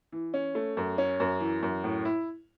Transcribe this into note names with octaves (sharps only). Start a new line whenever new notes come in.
E3
C#4
A3
F#2
C#4
F#2
E3
F#2
A2
E4